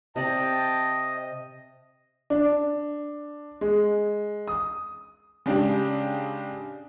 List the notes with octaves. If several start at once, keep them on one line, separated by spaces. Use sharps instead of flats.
C3 D5 D#5 G5 A5
D4
G#3
D#6
C#3 G#3 D4 G4